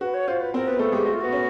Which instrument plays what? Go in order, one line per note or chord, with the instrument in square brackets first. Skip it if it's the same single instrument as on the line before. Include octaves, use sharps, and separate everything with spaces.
[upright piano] F#4 [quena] B4
[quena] C#5
[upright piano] F4 [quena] C5
[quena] B4
[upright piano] C4 [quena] A#4
[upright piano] B3 [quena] B4
[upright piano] A3 [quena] A4
[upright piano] G#3 [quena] G4
[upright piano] A3 [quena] F#4
[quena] F4
[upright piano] B3 [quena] F#4
[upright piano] C#4